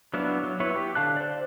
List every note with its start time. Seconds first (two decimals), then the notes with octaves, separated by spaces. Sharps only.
0.14 F#3 B3 D4 E4 F5
0.44 F#3
0.60 B3 E4 B4 C#5
0.76 G4
0.95 D3 F5 A5 F#6
1.16 C5 D5